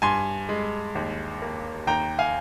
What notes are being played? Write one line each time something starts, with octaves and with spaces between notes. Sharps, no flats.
G2 G#5 C6
G#3
D#2
A#3
D#2 G5 A#5
F5 G#5